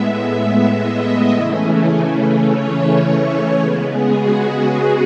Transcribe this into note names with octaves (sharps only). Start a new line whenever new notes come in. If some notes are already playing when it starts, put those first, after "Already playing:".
Already playing: A2 G#3 B3 E5
D#5
C#3 E3 A3 C#4
C#5
C#3 G#3 B3 B4
G#4
F#4
G#4